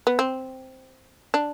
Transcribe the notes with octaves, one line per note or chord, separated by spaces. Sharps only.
B3
C4
D4